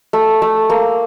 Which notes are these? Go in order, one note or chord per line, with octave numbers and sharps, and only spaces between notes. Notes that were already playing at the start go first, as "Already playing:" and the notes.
A3
A3
A#3